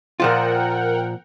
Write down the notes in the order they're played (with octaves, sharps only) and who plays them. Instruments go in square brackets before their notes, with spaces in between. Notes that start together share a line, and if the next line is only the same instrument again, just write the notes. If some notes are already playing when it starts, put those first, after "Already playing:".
[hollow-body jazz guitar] A#2 F3 F4 [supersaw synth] A#4 F#5 G5